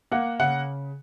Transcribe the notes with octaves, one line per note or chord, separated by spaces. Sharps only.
A#3 F#5
C#3 F#5